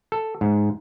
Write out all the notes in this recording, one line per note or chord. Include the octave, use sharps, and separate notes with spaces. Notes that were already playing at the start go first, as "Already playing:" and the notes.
A4
G#2